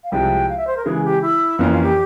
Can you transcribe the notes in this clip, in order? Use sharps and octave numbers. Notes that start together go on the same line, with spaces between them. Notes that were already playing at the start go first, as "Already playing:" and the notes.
F5
C2 C3 F3 G#3 E4 G5
F5
E5
C5
A#4
C#3 E3 G#3 G#4
G4
E4
F2 E3 A#3 C#4 F4
F4
G4